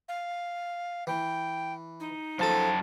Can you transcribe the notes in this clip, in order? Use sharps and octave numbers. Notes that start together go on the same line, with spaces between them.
F5
E3 G5
D#4
F#2 F3 A4 A5